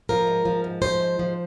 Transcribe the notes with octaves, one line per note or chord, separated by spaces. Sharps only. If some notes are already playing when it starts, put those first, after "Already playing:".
F3 A#4
G#2
F3
G#2
F3 C5
G#2
F3